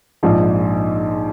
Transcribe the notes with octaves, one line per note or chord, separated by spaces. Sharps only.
A#1 G#2 F3